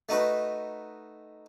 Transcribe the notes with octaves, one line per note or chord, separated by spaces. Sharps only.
A3 D#4 F#4 B4